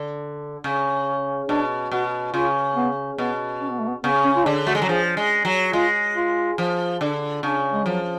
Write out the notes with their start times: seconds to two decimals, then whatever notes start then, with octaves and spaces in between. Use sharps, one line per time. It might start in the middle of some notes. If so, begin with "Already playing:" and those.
Already playing: D3
0.64 C#3
1.49 B2 D4
1.92 B2 F#4
2.33 C#3 F4
2.76 B3
3.18 B2 B3
3.61 C#4
3.71 B3
3.80 A3
3.89 B3
4.04 C#3 B3
4.25 C#4
4.36 F4
4.45 D3 D4
4.67 A3 F#4
4.75 G#3
4.82 F#3
4.89 F3 G#4
5.17 G#3
5.45 F#3
5.73 G#3 F4
6.16 F4
6.58 F3
7.01 D3
7.43 C#3 D4
7.73 G#3
7.86 F3 F#3